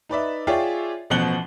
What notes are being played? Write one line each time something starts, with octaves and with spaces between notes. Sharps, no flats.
D#4 B4 D5 E5
F4 G#4 C#5 D5 E5 G5
A1 B2 F3 F#5 F#7 G7